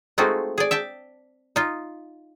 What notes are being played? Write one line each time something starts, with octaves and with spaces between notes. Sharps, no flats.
G#3 A3 C4 D#4 F4 F#4
G#4 D5
E5 G5 A5
D#4 F4